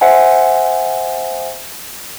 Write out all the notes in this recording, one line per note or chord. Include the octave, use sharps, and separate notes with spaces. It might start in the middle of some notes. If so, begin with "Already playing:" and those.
C5 E5 F#5 G#5